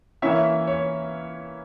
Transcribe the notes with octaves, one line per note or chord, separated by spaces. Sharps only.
E3 A#3 C#4 E4 C#5 E5
C#5